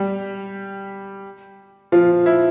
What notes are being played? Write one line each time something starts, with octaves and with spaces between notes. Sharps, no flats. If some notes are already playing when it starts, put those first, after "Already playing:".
Already playing: G3 G4
F3 F4
E4